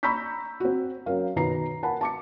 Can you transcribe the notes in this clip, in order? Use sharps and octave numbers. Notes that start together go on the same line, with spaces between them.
A#5 B5 C#6 E6 G6 B6
C4 F#4
F#3 C#4 A#4 F5
B2 D#3 D#4 B4 A#5 C7
A#4 F#5 G#5 A5 B5
A5 D6 C#7